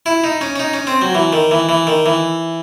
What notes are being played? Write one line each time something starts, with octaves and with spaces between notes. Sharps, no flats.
E4
D#4
C#4
C#4
D#4
C#4
C4
F#3
E3
D#3
E3
E3
D#3
E3